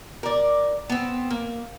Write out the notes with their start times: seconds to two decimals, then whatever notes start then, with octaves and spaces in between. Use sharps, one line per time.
0.23 A#4 D5
0.90 B3 C4
1.31 A#3